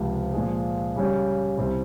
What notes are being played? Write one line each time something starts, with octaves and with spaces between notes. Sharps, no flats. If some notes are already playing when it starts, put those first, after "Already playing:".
Already playing: C#2 C3 F3
A#2 F3 G#3
C#3 G3 C#4 G4 C#5
C2 C3 G3 C4